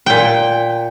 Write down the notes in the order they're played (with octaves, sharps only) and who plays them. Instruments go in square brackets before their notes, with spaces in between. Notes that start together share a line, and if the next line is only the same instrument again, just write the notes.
[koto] A#2 G5